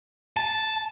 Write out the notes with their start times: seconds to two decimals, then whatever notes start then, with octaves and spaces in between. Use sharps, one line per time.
0.37 A5